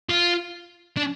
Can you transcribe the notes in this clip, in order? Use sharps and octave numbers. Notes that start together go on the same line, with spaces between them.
F4
D4